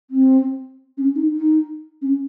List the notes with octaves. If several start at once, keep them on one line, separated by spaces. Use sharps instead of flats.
C4
C#4
D#4
D#4
C#4